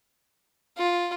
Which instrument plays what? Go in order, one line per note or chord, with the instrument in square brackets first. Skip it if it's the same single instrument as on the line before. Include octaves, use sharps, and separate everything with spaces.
[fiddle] F4